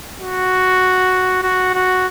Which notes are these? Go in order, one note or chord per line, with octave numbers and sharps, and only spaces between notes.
F#4
F#4
F#4